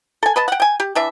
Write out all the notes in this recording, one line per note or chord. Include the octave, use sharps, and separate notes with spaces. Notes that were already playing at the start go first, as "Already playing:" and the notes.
A4 G#5
B4 D#5 A5
F#5 G5
G5 G#5
G4
E3 D4 E5